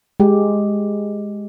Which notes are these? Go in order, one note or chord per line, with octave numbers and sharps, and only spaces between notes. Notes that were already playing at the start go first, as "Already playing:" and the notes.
G#3 G4